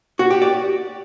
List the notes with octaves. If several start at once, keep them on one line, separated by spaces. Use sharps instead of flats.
F#4
G4
D5